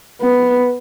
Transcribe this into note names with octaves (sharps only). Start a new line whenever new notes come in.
B3